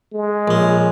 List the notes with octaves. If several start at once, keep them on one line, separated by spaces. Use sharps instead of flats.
G#3
A#1 C#4